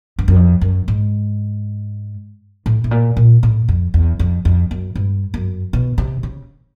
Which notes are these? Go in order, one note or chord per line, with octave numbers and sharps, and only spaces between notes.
G2
F#2
F2
F#2
G#2
A2
A2
A#2
A#2
A2
F2
E2
F2
F2
F#2
G2
F#2
B2
C3
C#3